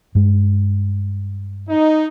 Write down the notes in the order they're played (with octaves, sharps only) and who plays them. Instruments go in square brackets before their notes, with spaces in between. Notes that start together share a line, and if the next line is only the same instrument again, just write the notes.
[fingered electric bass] G2 G#3
[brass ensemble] D#4